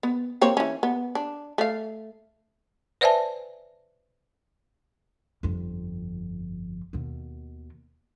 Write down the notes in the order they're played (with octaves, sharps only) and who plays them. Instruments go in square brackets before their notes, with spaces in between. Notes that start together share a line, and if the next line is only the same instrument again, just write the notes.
[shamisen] B3
A#3 C4 C#5
E3 C#4
B3
D4
A3 F5
[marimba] B4 C5 D5 E5 G#5 A5
[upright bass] G1 F2
D#2 B2